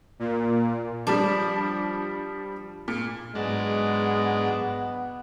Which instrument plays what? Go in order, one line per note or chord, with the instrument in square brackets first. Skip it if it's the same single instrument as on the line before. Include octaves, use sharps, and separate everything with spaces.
[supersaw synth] A#2
[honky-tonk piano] F3 G3 [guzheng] D4
[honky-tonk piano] A#2
[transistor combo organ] G#2 F#3 D4 [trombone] G#3 [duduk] B3